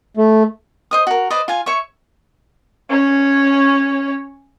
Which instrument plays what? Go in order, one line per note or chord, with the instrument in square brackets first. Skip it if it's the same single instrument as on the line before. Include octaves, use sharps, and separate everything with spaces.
[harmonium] A3
[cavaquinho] C5 D#5 D#6
F#4 A#4
B4 C5 D5 D#5
F4 F5 G#5
C#5 E5 C#6
[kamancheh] C#4 C#5